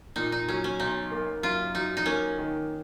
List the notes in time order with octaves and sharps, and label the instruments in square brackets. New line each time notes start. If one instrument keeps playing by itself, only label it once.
[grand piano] A#2 [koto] D#4
[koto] D#4
[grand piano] F#3 [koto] C#4
[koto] C#4
[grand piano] B1 [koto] D#4
[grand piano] A#3
[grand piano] F#2 [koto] F4
[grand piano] F#3 [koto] D#4
[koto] D#4
[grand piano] A#3 [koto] C#4
[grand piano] D#3